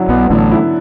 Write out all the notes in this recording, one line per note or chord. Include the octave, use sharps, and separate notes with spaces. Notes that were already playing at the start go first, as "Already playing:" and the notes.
Already playing: D3 F#3 E4
B1 B2 B3
A1 A2 D3
E4